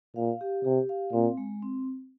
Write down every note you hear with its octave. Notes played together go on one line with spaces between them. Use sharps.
A#2 F5
G4
C3 G4
F5
A#2 C4
G#3
C4